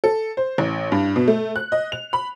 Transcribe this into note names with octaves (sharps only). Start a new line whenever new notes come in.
A4
C5
A1
G2
B2
A3
F#6
D#5
F7
B5